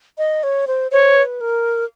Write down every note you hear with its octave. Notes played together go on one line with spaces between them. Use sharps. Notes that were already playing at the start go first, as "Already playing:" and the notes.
D#5
C#5
C5
C5 C#5
B4
A#4